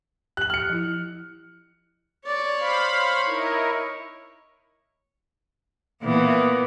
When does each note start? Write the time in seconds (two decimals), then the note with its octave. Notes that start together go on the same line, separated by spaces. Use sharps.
0.37 G4 F#6 F#7
0.50 F6 C#7
0.69 F3 E4
2.26 C#5 D5
2.60 C5 F5 B5
2.90 C#5
3.27 D#4 E4 A#4
6.03 A#2 E3 B3